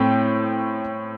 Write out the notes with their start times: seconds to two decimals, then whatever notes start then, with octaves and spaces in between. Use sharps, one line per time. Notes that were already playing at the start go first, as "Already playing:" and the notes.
Already playing: A2 A3 C4 G5